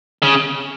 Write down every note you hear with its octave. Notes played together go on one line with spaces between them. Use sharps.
C#3